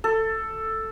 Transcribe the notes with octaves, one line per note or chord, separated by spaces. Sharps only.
A4